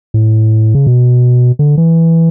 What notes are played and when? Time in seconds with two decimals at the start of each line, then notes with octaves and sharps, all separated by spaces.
0.14 A2
0.75 C#3
0.87 B2
1.59 D3
1.78 E3